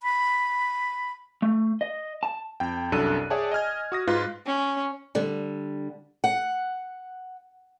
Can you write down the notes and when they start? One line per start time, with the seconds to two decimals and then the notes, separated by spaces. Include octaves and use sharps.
0.03 B5
1.42 A3
1.81 D#5
2.23 A5
2.60 F2 G5
2.92 C2 F#2 D4 A4 F#6 D#7
3.30 G#4 C#5 D5 E5 G5 A5
3.51 D#5 G#5 F6 G#6
3.92 F#4 D#6 A#6
4.07 G#2 F4 B4 F#6
4.46 C#4
5.15 D3 G3
6.24 F#5